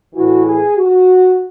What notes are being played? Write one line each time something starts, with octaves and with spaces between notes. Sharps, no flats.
A2 E3 F#4
G#4
F#4